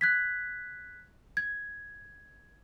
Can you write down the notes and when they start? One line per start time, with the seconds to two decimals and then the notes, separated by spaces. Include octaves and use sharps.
0.01 F#6 G#6 B6
1.37 G#6